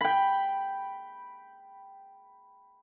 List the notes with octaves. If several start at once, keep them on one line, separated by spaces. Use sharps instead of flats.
G5 B5